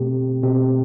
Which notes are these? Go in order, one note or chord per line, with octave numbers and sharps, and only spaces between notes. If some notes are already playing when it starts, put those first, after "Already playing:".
Already playing: B2 A3 C4 G4
B2 A3 C4 G4